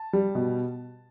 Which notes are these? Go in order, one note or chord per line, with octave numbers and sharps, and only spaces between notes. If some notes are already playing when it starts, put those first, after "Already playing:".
Already playing: A5
G3
B2